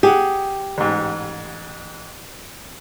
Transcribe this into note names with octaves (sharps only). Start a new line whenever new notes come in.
G4 G#4 F#5
A1 G#2